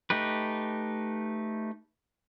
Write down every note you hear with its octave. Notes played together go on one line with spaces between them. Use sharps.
A3 D#4 G4 B4